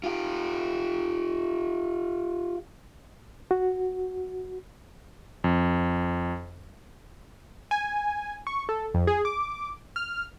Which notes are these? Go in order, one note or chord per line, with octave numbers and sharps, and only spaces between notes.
F4 G4
F#4
F2
G#5
C#6
A4
F2
G#4
D6
F6